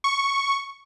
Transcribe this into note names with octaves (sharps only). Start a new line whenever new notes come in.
C#6